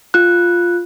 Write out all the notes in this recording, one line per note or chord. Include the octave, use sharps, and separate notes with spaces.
F4 F#6